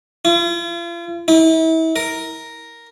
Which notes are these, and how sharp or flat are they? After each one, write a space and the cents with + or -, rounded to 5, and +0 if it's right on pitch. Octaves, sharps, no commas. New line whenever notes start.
F4 -40
E4 -35
A#4 +0